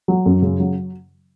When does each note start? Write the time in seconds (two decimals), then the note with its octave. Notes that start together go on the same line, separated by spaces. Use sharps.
0.08 F#3
0.26 F#2
0.42 C#3
0.60 F#3